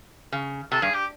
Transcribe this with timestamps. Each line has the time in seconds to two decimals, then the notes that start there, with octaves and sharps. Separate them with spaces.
0.32 C#3
0.72 C3 A4
0.82 G2 G#4
0.94 G4